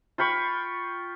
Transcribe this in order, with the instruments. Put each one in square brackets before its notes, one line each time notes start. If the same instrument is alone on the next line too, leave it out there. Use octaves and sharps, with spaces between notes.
[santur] F4 G5 B5 C#6